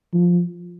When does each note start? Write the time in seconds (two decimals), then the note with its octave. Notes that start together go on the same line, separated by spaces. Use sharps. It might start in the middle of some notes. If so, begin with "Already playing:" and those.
0.14 F3